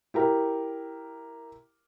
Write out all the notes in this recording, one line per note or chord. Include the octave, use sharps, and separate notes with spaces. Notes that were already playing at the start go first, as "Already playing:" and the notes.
E4 G4 A#4